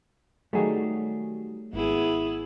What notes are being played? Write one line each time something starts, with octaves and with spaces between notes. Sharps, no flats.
D#3 F#3 G3 A3 G#4
G#1 B3 E4 G#4